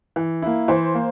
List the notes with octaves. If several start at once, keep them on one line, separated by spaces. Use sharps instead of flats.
E3
A#3 E4
E3 C5
A#3